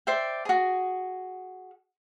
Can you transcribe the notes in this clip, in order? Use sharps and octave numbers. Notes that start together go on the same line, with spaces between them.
C5 D5 E5 G5
F#4 G#4